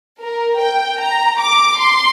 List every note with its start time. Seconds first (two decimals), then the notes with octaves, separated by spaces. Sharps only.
0.23 A#4
0.62 G5
1.02 A#5
1.41 D6
1.80 C6